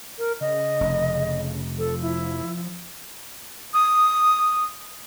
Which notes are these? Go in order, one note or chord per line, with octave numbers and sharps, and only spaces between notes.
A#4
C#3 D#5
F1
F3 A4
E4
D#6